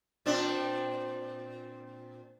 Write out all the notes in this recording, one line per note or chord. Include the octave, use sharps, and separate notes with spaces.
A#2 C4 D4